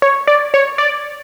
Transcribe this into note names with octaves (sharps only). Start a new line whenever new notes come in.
C#5
D5
C#5
D5